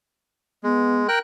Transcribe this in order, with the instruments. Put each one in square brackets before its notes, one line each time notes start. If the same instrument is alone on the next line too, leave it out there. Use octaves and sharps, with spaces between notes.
[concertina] G#3 [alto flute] B3
[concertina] A#4 G5 F#6